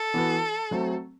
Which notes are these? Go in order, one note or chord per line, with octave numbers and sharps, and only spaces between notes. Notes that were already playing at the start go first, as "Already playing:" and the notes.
Already playing: A4
E3 B3 F#4 B4
F#3 A3 C4